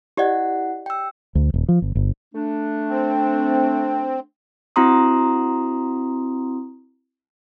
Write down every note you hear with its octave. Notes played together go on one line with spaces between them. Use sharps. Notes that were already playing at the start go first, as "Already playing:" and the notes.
E4 G4 D5 D#5 F#5
G5 E6
D2
D#1
F3
G1
G1
A3 D4
C4
C4 E4 F#4 A#5 C6 D#6